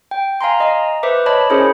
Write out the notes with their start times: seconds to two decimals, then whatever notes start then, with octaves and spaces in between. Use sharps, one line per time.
0.11 G5
0.41 F5 G#5 A#5 C6
0.60 D#5 A#5
1.03 B4 C5 E5 D6
1.26 C#5 D#5 A5 B5
1.50 C#4 E4 G#4 A#4 C5 C#5